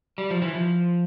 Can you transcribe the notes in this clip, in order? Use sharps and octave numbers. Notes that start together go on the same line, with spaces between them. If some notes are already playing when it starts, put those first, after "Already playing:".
G3
F3
E3
F3